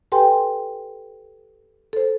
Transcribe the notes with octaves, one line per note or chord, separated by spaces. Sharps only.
G4 A4 B4 G5 G#5 C6
A4 C5